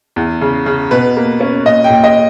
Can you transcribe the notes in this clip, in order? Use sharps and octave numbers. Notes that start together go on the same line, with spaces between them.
E2
C#3
C#3
B2 B4
A#3
C#4
A#2 D#5
G5
A#2
D#5